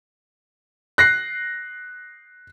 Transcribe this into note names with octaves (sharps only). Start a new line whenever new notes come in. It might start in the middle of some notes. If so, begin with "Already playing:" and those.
F#6 A#6 C7